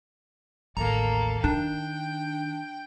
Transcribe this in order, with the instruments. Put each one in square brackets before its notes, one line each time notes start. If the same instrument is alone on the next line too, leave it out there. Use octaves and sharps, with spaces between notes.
[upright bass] A1 D#2 [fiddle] A#3 A4 [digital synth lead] A#5
[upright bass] D#3 [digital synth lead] D4 [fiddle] G5